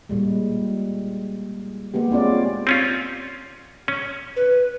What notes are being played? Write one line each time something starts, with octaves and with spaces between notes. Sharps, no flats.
A#2 G3 G#3
G#3 A#3 B3 G4
C4 C#4 F4 D5
C4 C#4 F4
C#4
B4